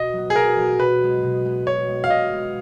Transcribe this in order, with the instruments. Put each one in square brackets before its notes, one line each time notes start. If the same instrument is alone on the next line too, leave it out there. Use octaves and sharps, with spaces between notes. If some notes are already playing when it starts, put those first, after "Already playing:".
Already playing: [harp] B2 [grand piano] D#5
[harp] F#3 B3
[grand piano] G#4
[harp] B2 [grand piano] A#4
[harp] F#3 B3
[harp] B2 [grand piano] B4
[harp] G#3 B3
B2
G#3 B3
[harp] B2 [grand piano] C#5
[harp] G#3 B3
[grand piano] F5
[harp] B2 [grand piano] D#5
[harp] G#3 B3